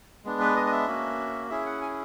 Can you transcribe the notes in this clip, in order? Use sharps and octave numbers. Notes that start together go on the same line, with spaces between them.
G#3 B3 D4
B4
D#5
D#5
E5
A#3 C#4 F#4
C#4 E4 G#4 E5
F#5
G#5